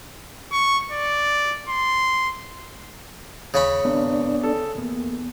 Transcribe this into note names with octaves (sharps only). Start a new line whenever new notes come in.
C#6
D5
C6
D#2 C#3 C#4 B5
G#1 B3 D4 D5
A4
E2 A#3